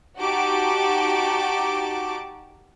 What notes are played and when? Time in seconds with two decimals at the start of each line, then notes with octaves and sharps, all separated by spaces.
0.19 D#4 F#4 G4 A5 D6